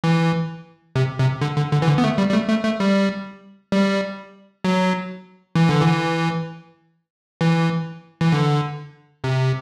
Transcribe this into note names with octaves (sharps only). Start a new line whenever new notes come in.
E3
C3
C3
D3
D3
D3
E3
D3
B3
A3
G3
G3
A3
A3
A3
G3
G3
F#3
E3
D3
E3
E3
E3
D3
C3